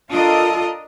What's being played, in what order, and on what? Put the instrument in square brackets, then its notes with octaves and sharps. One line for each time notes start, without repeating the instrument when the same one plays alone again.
[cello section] D4 A#4 D#5 [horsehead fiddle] F4 A4